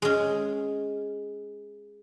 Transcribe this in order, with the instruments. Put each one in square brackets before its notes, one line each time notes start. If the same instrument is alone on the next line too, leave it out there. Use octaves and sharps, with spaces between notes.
[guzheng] G#3 C#4